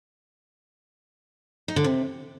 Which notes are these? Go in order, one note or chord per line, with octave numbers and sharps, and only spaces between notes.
D#4
D3
C3